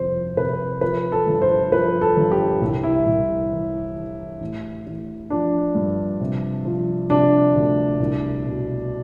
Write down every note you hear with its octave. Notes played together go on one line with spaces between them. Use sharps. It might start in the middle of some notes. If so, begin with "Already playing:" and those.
Already playing: G1 F2 C3 C5
C3 B4
F3 B4
A4
G1
C5
F3 B4
A4
G1
G4
C2
E4
C2
E3
E3
A1
A1
F3 D4
G2
C3
F3
C3 D4
D2
C2
B2